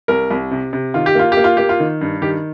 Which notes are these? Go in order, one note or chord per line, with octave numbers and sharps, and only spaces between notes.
C2 A#4
C2
C3
C3
D#3 F4
G4
A#3 F4
G4
A#3
F4
A#3 G4
F4
D#3
G2
D#3 G4